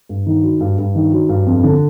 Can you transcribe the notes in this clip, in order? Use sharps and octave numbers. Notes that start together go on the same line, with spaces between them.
G2
D#3
F#3
G2
G2
D#3
F#3
G2
F2
D3